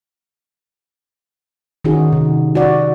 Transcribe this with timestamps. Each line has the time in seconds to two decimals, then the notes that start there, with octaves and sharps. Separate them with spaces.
1.85 D#3 C#4 D#4 F#4 G#4
2.13 C3
2.55 F#4 D5